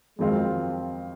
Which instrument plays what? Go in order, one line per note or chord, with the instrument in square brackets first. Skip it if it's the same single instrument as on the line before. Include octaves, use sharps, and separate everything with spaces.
[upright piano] F2 D#3 F#3 C4 F4 [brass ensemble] G#3